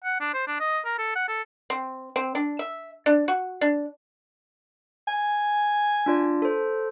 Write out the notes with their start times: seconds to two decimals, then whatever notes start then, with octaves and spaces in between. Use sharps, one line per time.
0.05 F#5
0.21 D4
0.34 C5
0.47 D4
0.60 D#5
0.85 A#4
0.98 A4
1.16 F#5
1.28 A4
1.70 C4
2.16 C4
2.35 D4
2.59 E5
3.06 D4
3.28 F#4
3.61 D4
5.08 G#5
6.06 D4 F4 D5
6.42 A4 C5